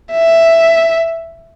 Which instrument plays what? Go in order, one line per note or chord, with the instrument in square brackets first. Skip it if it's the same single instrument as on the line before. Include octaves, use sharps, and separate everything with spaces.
[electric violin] E5